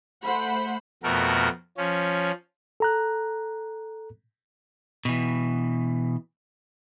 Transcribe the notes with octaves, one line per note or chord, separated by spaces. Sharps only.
A3 C5 F#5 B5
F2 B2 A3 F#4 A#4
F3 C#4
A4 A#5 F#6
B2 E3